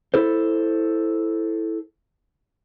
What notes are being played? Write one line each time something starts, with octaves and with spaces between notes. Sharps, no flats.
E4 A4 C5